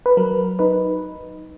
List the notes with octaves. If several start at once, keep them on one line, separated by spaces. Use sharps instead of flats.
B4
F#3 A#4
D#4 B4